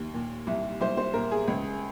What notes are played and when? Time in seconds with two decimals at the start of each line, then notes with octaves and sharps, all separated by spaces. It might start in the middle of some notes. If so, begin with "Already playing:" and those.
Already playing: D#2
0.14 A#2
0.47 C2
0.81 C2 C5
0.97 C5
1.14 A#2 A#4
1.31 G#4
1.48 C#2